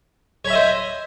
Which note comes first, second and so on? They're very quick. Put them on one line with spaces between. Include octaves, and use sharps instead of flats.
C#5 B5 E5 D#5 C5